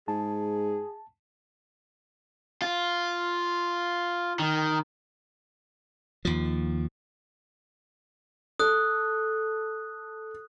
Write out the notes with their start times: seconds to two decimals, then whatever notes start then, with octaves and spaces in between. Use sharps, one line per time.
0.08 G#2 G#4 A5
2.62 F4
4.40 D#3
6.25 D#2 F3
8.59 A4 D#6 F#6